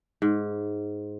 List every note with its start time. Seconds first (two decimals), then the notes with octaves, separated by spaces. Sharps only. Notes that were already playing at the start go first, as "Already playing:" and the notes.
0.22 G#2